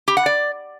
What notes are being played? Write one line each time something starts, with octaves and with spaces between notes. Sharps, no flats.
G4
F#5
D5